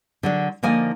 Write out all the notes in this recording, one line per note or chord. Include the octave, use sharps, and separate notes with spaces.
D3 F#3 D4
D3 F3 A#3 D#4 G#5